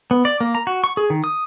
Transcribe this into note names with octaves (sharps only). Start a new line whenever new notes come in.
B3
D5
A#3
A#5
F#4
C#6
G#4
D#3
D#6